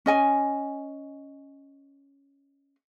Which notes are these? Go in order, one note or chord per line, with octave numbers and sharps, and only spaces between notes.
C#4 D#5 G#5